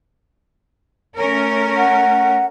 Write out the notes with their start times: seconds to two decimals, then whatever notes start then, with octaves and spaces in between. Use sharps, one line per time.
1.17 A3 C#4 A#4
1.77 F#5